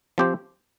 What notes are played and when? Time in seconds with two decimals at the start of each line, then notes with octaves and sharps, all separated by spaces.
0.18 F3 C4 G4 C5